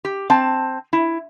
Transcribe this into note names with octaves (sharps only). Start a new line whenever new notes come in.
G4
C4 A5
E4